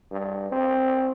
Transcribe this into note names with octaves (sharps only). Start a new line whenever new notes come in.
G2
C4